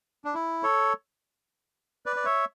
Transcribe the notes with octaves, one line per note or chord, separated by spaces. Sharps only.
D4
E4
A4 C#5
B4 D5
D5
C#5 E5